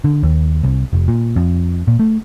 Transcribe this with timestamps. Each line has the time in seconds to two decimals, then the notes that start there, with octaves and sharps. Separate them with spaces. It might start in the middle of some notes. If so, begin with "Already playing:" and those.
0.04 D3
0.23 D#2
0.64 C2
0.93 F1
1.08 A#2
1.36 F2
1.88 A#2
2.00 A3